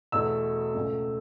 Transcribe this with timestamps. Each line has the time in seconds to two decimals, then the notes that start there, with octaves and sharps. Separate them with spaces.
0.12 E2 B2 A3 E6
0.74 C#2 B2 A3